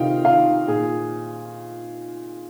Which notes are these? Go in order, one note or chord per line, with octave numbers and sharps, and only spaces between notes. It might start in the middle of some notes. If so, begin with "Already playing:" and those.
Already playing: C3 D#3 D#4 F4 F5 G5
D#3 F4 F5
A#2 G#4